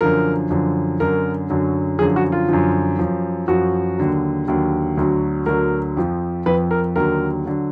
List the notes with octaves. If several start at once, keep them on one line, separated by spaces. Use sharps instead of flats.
F#2 D3 F3 A#4
F#2 D3 F3
F#2 D3 F#3 A#4
F#2 D3 F#3
F#2 D3 F3 G#4
F#4
F4
F#2 D3 F3
F#2 F3
F#2 F3 F#4
D#2 D3 F#3
D#2 D3 F#3
D2 D3 F#3
D2 D3 F#3 A#4
F2 F3
F2 F3 B4
A#4
D#2 D3 F#3 A#4
D3 F#3